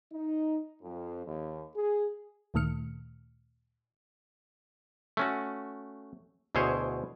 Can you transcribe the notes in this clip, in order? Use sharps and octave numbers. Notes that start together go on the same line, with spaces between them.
D#4
F2
D#2
G#4
D2 A#2 D#3 A3 F6 C#7
A3 C#4 F#4
D2 B2 E4 G#4 C5 C#5